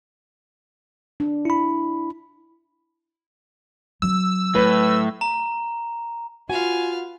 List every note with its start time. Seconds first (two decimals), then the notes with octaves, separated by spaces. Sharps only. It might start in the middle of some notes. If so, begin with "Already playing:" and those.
1.20 D4
1.45 E4 B5
4.02 F#3 C4 E6
4.55 A2 B4
5.21 A#5
6.49 F4 F#4 B4 F5 G#5